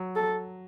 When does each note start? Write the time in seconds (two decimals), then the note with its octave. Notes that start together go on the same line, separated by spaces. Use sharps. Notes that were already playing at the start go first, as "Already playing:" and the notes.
Already playing: F#3
0.16 A4